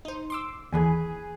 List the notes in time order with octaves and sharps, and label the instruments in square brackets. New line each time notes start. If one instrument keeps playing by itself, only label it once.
[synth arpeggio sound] D#4 C5
C6 D6 E6
[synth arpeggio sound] D#2 E3 [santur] G#4 B4 G#5